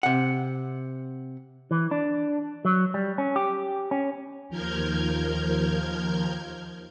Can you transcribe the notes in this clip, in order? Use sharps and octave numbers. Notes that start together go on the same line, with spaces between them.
C3 F#5
E3
D4
F#3
G3
C#4
G4
C#4
D#2 F3 A#4 F6 G6 G#6